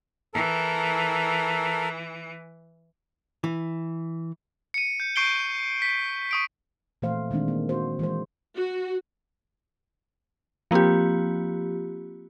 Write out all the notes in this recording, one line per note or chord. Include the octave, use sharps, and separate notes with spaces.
E3 A4 A#4
E3
C#7 D#7
G6 C#7
C#6 G6 C7 D7 G7
B6 C7
C#6 D#6 D7
A#2 E3 F3 A3 C5 F5
D#3 G#3 C4 D4
A#3
F#4 C5
E3 G#3 C5
F#4
F3 A#3 C4 F4 G4